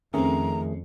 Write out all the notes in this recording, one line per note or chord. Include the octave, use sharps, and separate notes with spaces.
F2 D#3 A3 C4 C#4 G#4 A#5